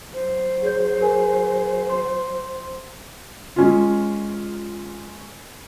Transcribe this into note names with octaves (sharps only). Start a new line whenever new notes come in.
F#3 C5
G#4 C#5 G6
G#4 A#4 G#5
C6
G#3 C#4 F4